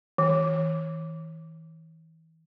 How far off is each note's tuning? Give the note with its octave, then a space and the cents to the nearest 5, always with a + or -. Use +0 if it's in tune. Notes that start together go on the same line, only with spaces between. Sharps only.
E3 -35